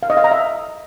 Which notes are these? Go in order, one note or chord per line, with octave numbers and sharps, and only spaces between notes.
F5
D#5
F5
A#5
E5